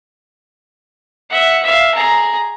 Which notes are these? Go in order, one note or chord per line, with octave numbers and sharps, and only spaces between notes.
E5 F#5
E5 F5
G#4 A#5